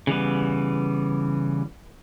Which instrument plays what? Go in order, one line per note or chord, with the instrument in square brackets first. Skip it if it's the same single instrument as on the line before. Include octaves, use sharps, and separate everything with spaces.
[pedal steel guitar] C#3 E3 G3 B3